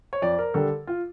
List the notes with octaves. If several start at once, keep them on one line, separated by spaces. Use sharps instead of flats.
C#5
F2 D5
A#4
D3 G3 A4
F4